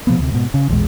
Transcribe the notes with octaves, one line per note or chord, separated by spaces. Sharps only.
B2 F3 A#3 B3
D2 C3
G#2 B2
C#3
A#1 E2 B2 G#3